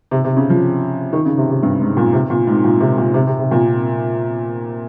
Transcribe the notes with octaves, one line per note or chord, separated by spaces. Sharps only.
C3
C3
C#3
F3
D#3
C#3
C3
C3
G2
G#2
A#2
C3
A#2
G#2
A#2
C3
A#2
C3
C3
C3
A#2